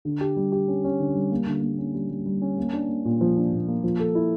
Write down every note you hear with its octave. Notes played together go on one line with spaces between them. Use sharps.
D3
G4
G3
G4
C#4
C#4
D3
G3
A#3
D3
A#3
C#4
G3
G3
G3
C#4
A#3
D4
A#3
A#2
F3
D4
A#2
A#3
F3
A4
E4